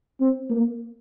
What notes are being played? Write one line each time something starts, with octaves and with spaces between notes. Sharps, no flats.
C4
A#3